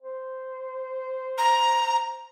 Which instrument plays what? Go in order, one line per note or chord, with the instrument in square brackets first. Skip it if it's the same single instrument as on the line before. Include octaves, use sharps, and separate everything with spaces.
[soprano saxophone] C5
[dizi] A#5